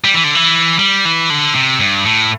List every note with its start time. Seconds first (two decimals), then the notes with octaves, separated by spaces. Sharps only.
0.04 G3
0.14 E3
0.24 D3
0.35 E3
0.79 G3
1.05 E3
1.30 D3
1.54 C3
1.80 G2
2.05 A2